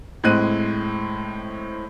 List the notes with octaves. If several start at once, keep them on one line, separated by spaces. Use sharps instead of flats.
A2 G#3 C4 F#6 D#7